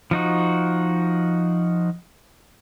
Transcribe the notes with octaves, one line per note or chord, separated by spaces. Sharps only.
F3 D#4 F#4